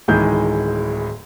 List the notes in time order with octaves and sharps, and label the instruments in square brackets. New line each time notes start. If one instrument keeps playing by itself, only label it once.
[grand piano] D1 D#3 E3 G#3 G#4 G6